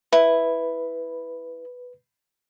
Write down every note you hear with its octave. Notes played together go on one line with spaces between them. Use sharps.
E4 B4